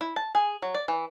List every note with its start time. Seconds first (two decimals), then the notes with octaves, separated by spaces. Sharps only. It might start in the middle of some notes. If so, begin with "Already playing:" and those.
0.01 E4
0.16 A5
0.35 G#4
0.62 F#3
0.75 D5
0.88 E3